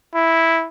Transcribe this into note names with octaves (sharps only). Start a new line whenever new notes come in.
E4